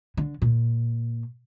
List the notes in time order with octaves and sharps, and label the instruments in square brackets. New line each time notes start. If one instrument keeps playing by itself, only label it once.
[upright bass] D3
A#2